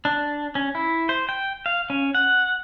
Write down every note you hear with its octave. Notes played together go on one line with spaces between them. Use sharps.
D4
C#4
E4
C5
G5
F5
C#4
F#5